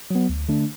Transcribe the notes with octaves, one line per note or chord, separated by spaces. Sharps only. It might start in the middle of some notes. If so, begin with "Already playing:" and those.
F#3 B3
D2
D3 A3 D4